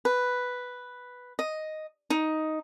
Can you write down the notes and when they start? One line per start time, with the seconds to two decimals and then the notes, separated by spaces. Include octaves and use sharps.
0.05 B4
1.39 D#5
2.10 D#4